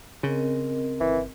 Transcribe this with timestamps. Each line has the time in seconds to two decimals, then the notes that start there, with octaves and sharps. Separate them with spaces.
0.23 C#3 C4 A#4 D#5
1.00 G1 E3